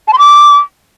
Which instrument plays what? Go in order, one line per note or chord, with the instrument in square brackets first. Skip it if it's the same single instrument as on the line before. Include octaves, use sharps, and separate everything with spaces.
[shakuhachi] A5
C6
D6